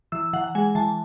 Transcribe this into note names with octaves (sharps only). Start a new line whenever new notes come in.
E3 E6
E3 F#5
F#5
G#3 G#5
E3 A5